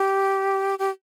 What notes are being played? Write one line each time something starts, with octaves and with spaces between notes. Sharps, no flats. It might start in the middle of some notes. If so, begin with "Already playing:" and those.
Already playing: G4
G4